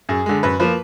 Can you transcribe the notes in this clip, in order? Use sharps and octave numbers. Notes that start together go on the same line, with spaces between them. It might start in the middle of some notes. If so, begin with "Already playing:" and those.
F#2 G#4
D3 G#3
F#2 B4
F3 A#3 B4